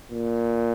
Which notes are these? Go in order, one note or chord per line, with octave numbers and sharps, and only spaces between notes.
A#2